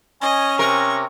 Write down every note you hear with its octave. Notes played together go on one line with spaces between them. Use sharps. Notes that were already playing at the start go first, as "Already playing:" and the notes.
C#4 D#5 G#5
C3 A#4 C#6